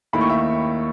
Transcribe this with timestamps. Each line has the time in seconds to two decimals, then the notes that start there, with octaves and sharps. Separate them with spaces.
0.13 D#2 D#3 A3 E4 B5
0.21 C#6
0.30 E5